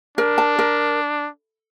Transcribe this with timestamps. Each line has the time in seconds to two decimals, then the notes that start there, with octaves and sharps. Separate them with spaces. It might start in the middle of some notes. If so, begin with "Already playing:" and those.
0.18 D4 A#4
0.38 A5
0.59 A#4